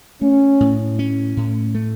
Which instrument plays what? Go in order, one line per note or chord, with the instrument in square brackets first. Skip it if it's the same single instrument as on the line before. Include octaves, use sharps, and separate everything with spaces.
[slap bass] A3 [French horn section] C#4
[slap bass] A2
C#4
A2
A3